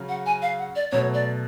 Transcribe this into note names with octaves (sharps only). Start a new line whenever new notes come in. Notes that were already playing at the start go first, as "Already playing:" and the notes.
Already playing: C#3 F#3 C#4
F#5
G#5
F5
F#5
D5
B2 F#3 A3 C#5
D5